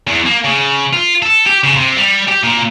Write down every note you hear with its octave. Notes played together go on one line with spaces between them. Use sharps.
E2
A#3
C#3
F4
A4
G4
C#3
C3
G3
G4
A#2